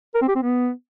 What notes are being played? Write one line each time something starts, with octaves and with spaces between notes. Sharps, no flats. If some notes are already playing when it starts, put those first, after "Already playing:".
A#4
C4
G4
C4
B3